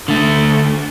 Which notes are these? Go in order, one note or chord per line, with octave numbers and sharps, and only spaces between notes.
D3 A3